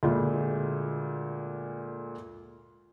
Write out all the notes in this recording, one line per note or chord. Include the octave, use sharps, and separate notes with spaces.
D2 A#2 G#3